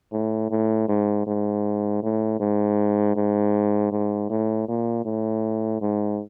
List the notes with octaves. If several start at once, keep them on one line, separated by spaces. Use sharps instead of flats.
A2
A2
G#2
G#2
A2
G#2
G#2
G#2
A2
A#2
A2
G#2